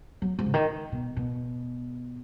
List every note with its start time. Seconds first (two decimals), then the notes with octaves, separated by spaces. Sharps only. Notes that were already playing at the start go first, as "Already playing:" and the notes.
0.22 F#3
0.39 G#2
0.46 C#3
0.54 D#3
0.92 B2
1.17 B2